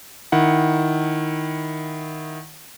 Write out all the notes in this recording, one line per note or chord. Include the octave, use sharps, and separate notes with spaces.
D#3 E4 F#5